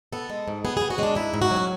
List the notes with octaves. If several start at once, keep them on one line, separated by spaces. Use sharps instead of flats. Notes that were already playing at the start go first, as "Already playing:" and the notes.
B3 A4
G#3
G#2
B3 G#4
B3 G#4
F#4
G#3 C#4 D4
G#2 E4
G#2
F#4
F#3
C#4